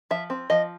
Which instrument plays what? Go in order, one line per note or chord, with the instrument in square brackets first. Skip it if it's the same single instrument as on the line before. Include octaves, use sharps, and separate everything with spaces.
[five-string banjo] F3 E5
C4
F3 D#5